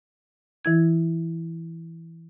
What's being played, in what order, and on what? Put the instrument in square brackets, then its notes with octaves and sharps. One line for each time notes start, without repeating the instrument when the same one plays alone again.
[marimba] E3 E4 G#6